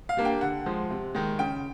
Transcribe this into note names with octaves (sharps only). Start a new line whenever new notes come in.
F5
G3 A#3 D4
G5
D3 F#5
F3 G#3
C3
D#3 G#3
C#3 G5